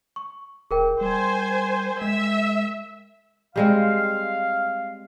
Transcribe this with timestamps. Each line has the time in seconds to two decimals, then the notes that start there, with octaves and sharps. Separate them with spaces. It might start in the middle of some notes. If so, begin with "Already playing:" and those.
0.16 C#6
0.71 D#1 G#4 A#4 G5
1.01 G3 C5 G#5
2.02 G#3 E5
3.56 G3 G#3 C4 F5